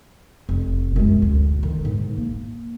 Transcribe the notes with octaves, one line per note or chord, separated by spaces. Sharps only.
F1
F#2 G#3
D2
D3 D#3
G#2
A#3